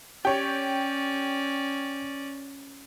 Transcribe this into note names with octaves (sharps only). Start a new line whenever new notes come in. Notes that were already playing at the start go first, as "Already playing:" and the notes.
C#4 G4 C#5 D5